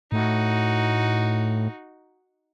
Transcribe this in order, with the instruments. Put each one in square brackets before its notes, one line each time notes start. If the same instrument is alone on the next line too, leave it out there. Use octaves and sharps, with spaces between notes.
[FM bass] A2 [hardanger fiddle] D#4 F#4